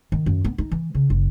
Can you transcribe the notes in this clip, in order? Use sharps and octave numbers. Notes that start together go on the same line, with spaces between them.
D#3
F#2
B3
D#4
E3
C#3
F#1